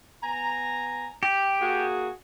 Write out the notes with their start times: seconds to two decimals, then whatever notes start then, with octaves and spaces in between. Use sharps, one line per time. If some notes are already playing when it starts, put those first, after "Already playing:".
0.23 B3 G#5 A#5
1.23 G4
1.60 A#3 F#4 G#4